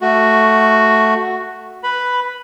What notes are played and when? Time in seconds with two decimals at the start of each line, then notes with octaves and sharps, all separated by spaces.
0.01 A3 F#4
1.84 B4 B5